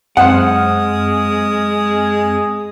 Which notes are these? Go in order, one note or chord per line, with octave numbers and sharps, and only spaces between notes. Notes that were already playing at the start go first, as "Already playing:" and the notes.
F#2 G#3 C4 C5 F#5 D#6 F6